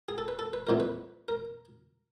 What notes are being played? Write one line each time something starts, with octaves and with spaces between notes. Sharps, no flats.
G#4
A4
B4
A4
B4
C2 A#2 F3 A3 A#4
B4
A#4